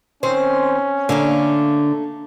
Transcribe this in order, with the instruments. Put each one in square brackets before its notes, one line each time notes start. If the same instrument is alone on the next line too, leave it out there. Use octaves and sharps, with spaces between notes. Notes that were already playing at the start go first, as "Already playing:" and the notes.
[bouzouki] D#3 C4 C5 [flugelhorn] C#4
[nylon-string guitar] D3 [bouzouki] A3 A#3 F5